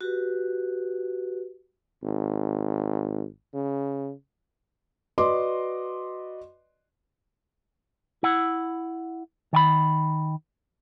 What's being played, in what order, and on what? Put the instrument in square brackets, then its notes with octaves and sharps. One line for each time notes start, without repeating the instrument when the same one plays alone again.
[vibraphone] F#4 G4 B4
[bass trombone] G#1
C#3
[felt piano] F#4 B4 D5 D#5 C6 D6
[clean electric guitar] E4 F#5
D#3 G5 B5